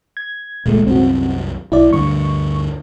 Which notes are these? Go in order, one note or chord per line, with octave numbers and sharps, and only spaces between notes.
G#6
D#1 C#2 A#2 G#3 A3
C2 F#2 C4 F#4
B1 E4 D5
D2 G2 D3 C#6